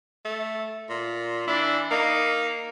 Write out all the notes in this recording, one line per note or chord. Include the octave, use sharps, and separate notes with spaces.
A3
A#2
E3 D4 E4
A#3 D#4